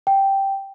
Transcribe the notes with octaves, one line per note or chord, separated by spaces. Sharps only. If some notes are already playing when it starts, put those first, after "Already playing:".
G5